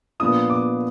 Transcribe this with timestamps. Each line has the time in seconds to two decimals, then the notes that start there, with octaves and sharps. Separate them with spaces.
0.20 A#2 F3 B3 D4 F4 D#6
0.50 D6